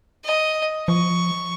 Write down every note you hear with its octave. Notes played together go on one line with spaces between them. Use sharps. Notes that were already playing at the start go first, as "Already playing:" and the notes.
D#5
F3 C#6